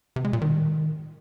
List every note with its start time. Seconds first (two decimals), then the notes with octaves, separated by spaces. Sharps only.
0.16 C3
0.25 G#3
0.33 A#2
0.42 D#3